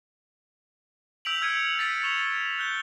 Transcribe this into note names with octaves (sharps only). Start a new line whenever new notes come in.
E6 G6 B6 D7 F7 F#7
E6 F6 G#6 C#7 D#7 F#7
A6 B6 D#7
C#6 A6 E7 F7 G7
F#6 G6 G7